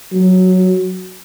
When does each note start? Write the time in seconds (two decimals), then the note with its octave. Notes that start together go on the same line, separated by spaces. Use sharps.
0.13 F#3